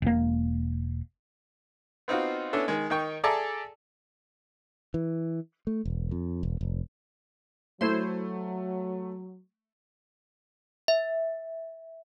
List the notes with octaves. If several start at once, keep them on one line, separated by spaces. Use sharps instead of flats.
E1 A#3
B3 C4 D#4 F4 F#4
B3 C#4 D4 E4 A4
D#3 G#3
D#3 D#4 G5 C#6
G#4 A4 D5 E5 A5 A#5
E3
A3
E1
F2
E1
F1
F#3 A3 E4 C5 C6
E5